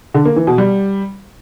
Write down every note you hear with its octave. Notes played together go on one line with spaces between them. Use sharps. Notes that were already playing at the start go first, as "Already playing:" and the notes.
D3
A#3
E3
B2
G3